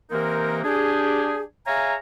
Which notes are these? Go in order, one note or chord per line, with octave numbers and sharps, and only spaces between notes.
C3 E3 A#3 C4 D#4 A#4
D4 G4 G#4
G#4 C#5 E5 F5 G#5 A#5